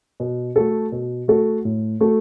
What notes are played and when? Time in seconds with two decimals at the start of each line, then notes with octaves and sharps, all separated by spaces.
0.20 B2
0.56 A3 F#4 A4
0.92 B2
1.28 A3 F#4 A4
1.65 A2
2.01 A3 F#4 A4